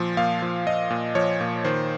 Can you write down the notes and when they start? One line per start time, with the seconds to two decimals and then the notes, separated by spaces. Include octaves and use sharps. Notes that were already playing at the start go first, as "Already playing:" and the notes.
Already playing: A#2 F3
0.17 A#2 F5
0.42 F3
0.66 F3 D#5
0.90 A#2
1.15 F3 C#5
1.41 A#2
1.64 D#3 C5